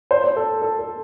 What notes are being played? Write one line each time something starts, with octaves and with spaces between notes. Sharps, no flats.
C5
C5
A4
A4
A4